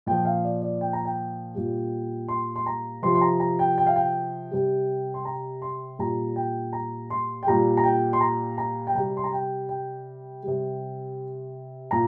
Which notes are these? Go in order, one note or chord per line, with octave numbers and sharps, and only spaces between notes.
A#2 F3 G5
F5
D5
D5
G5
A#5
G5
A#2 G3
C6
C6
A#5
C3 F3 C6
C6
A#5
A#5
G5
G5
F5
G5
C3 G3
C6
A#5
C6
A#2 G3 A#5
G5
A#5
C6
G5
A#2 G3 A#5
A#5
G5
C6
A#5
A#5
G5
C3 G3 A#5
C6
A#5
G5
G5
C3 G3
A#2 A#5